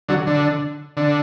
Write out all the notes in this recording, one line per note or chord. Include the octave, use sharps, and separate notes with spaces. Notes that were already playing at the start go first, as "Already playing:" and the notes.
D3 F#3
D3
D3